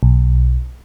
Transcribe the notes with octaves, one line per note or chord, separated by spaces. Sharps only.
B1